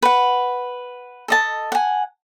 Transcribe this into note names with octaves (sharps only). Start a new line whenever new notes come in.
B4 F#5
A4 D#5 A5
F#5 G#5